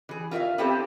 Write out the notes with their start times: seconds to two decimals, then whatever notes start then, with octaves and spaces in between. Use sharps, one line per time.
0.09 E3 G#4
0.31 F4 A#4 C#5 E5 F5
0.58 B3 C4 E4 G4 A4 C5